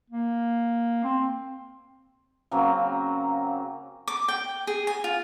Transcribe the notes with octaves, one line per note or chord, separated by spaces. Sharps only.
A#3
C4
C#3 F#3 A#3 C4
D6
G5
G#4
G#5
F4